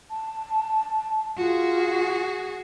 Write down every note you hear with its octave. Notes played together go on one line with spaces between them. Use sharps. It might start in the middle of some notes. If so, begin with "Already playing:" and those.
A5
F4 F#4 G#4